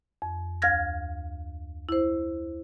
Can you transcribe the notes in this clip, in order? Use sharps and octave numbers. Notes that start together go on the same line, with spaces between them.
F2
D2 F5 F6 G#6 A#6
E4 C5